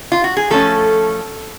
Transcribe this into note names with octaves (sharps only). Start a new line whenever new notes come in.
F4
F#4
G#4
F3 A3 C#4 A4